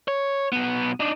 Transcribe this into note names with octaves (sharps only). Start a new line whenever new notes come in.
C#5
B1 B3
D4 D#4